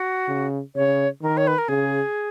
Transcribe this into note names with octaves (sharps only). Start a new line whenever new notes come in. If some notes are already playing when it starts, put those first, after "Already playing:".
Already playing: F#4
C#3
C#3 C#5
D#3 A#4
C#5
B4
A#4
C#3 G#4